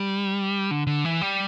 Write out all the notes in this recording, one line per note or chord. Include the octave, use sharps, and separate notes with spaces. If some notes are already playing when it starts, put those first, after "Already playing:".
Already playing: G3
D3
D3
E3
G3